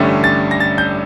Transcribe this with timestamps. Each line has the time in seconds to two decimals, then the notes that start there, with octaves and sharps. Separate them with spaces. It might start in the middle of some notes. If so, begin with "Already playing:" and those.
Already playing: A1 G2 D3 A3 C#4 A6
0.24 A6
0.51 A#6
0.60 A6
0.78 G6